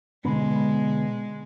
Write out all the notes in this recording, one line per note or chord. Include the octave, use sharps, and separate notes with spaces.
B2 D3 G#3 B3